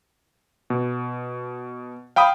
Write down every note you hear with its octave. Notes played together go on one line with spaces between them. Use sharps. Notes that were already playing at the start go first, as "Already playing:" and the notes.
B2
F5 G5 B5 D#6